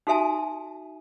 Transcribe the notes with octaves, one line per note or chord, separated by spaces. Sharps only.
D#4 F#4 A4 E5 G#5 A5